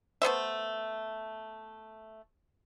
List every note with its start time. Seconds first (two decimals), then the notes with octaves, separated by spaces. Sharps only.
0.22 A3 B3 C5 E5